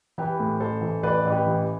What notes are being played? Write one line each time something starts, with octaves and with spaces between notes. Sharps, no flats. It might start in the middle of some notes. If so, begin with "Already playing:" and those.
E3 G4 B4
A2
A1 A4 C5
E3
A1 B4 D5
A1
G4 B4
E3